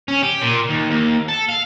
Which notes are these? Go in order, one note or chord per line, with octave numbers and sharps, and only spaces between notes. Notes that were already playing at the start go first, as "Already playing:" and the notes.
C#4
G4
A#2
D#2
D#2
A4
F5